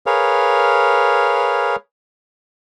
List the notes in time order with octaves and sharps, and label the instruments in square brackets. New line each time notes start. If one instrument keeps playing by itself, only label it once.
[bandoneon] G#4 A#4 B4 C#5 F5